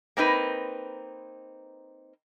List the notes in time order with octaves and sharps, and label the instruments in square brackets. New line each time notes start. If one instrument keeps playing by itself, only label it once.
[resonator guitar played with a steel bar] A#3 C4 D#4 B4